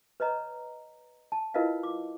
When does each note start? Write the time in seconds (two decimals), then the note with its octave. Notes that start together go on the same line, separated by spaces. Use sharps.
0.20 B4 C#5 D#5 A#5
1.32 A5
1.54 E4 F4 A#4 B4 D#5 F5
1.83 D6